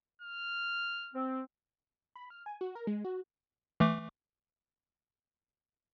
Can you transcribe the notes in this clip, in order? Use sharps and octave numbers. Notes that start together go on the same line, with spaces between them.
F6
C4
B5
F6
G#5
F#4
A#4
G#3
F#4
E3 A3 D6